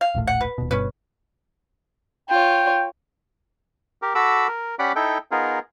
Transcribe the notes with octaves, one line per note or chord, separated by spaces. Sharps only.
F5
D#1 A#1 A2
F#5
B4
D#1 B2
G1 G2 B2 C#4 B4
F4 C#5 G5
G4 A#4
F#4 A4 B5 D6 E6
A#4
C#4 G4 D5 F#5 B5 D6
D#4 E4 A4 G5
B3 D#4 F4 G#4 A#4